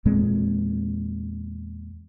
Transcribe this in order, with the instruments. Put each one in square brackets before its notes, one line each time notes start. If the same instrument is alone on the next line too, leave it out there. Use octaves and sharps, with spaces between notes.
[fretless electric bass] E2 A#2 G#3 C4